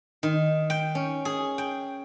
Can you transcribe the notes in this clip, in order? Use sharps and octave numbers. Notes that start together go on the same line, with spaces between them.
D#3
G5
C#4
G#4
G5